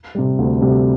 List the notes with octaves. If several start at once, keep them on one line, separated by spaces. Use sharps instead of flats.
C3 G3
D2
C3 G3